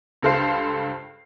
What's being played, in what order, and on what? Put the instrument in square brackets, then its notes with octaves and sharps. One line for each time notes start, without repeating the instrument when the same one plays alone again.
[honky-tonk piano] C#2 G2 A4 C5 F5 C7